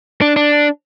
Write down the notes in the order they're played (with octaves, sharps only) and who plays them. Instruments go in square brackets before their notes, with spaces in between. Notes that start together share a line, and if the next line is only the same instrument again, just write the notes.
[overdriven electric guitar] D4
D4